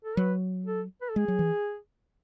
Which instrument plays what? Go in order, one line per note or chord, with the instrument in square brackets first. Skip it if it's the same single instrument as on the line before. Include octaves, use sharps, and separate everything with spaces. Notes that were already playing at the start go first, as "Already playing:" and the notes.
[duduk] A4
[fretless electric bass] F#3 [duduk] B4
[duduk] A4
B4
A4
[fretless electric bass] G#3 [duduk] G#4
[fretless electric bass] F#3
E3